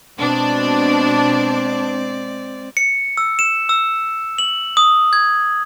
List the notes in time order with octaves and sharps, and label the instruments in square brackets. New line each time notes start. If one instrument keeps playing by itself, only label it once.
[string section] B2 D4 [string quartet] G#3 C4 D5
[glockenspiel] C#7
E6
E7
E6
F#7
D#6
G#6